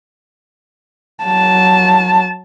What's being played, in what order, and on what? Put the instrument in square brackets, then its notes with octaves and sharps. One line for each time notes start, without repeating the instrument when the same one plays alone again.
[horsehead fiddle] F#3 A5